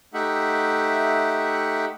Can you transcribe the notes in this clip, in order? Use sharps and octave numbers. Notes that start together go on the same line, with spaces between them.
A3 D#4 G4 E5 F#5